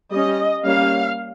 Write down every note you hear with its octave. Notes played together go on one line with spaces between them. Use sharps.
G3 C#4 D#5
G3 A#3 C#4 F5